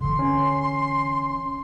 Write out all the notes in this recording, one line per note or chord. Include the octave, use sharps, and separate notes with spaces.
D3 E3 C6
C#4